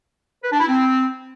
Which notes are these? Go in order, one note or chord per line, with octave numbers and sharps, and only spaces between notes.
B4
D4
E4
C4